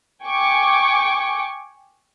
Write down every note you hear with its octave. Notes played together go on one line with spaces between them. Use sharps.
G5 G#5 C#6 D6